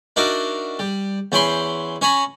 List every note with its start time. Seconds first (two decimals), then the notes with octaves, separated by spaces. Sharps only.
0.16 D4 D#4 F#4 A#4 E5
0.79 G3
1.32 E2 C#4 G5 B5 C6
2.01 C#4 C#5 G#5 A#5 B5